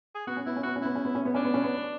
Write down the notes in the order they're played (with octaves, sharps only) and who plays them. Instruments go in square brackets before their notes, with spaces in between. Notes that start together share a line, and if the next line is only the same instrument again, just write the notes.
[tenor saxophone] G#4
[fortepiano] B3 [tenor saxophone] F#4
[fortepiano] C#4
[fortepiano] B3 [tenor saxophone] E4
[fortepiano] C#4
[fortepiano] B3 [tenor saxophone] F#4
[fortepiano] C#4
[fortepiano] B3 [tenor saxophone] E4
[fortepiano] C#4
B3
C#4
B3
[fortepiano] C#4 [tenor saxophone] D4
[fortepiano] B3
C#4
B3